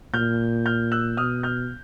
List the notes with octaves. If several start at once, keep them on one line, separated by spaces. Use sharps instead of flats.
A#2 F6 G6
F6 G6
E6 F#6
B2 D#6 F6
F6 G6